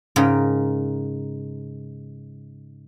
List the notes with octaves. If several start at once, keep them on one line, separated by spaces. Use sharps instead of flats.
G#2 C#3 A#4 G5